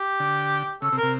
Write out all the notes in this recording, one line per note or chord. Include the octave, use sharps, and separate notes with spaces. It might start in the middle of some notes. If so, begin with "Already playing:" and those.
Already playing: G4
D3
C#3 A4
C3
A#4
C3